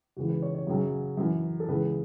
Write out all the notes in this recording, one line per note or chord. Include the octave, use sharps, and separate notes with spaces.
C#2 C#3 E3 F#4
B4
C#5
C#5
F#2 C#3 F#3
F#2 E3
A4
C#2 C#3 E3 B4